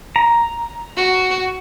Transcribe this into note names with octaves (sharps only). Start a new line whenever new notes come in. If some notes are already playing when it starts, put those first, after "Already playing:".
A#5
F#4